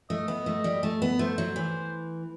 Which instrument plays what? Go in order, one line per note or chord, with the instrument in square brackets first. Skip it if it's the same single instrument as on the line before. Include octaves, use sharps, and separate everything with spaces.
[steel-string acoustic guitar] A3 [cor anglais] D#5
[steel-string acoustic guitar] B3
A3
G3
A3
B3
[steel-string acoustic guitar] A3 [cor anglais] C5
[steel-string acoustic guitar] F#3
E3